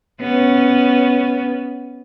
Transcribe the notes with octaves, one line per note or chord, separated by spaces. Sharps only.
B3 C#4